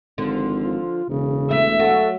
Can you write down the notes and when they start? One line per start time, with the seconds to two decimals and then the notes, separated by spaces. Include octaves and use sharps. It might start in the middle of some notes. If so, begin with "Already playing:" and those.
0.18 G#1 D3 F3
0.59 F4
1.09 E1 C#3
1.51 A3 E5
1.80 F#3 F#4 A4